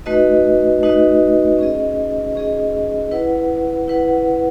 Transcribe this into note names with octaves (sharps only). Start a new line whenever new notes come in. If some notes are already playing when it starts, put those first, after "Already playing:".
A3 D#4 F#4 B4 D#5
A3 D#4 F#4 B4 D#5
C#4 G#4 D#5
C#4 G#4 D#5
E4 B4 F#5
E4 B4 F#5